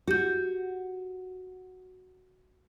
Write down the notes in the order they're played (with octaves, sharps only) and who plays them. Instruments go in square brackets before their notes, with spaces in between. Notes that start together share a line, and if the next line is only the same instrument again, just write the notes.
[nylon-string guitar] F#4 [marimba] G4 G6